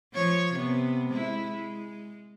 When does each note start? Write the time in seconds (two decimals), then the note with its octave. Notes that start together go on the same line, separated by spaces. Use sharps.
0.14 F3 C#5
0.54 C3 B3
1.09 G#3 E4
1.50 G#3